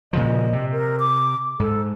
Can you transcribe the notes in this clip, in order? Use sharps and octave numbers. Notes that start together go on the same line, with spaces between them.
A#2 C#3 F3 D#5
C3
A#4
D6
G#2 A4